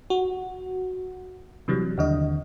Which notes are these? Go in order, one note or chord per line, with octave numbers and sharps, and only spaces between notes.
F#4
C3 E3 F#3 G3
D#2 D3 D#5